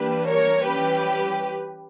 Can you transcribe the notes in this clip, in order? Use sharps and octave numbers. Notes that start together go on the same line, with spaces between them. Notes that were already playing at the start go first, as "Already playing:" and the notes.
Already playing: E3 G3 A#3 D4 G4 B4
A#4 C#5
E3 G3 C#4 G4 B4